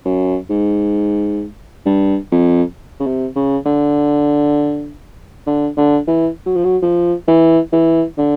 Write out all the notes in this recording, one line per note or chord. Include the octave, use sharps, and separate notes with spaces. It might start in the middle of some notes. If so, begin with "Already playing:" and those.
F#2
G#2
G2
F2
C#3
C3
C#3
D3
D3
D3
E3
F#3
F3
F#3
F3
E3
E3
D3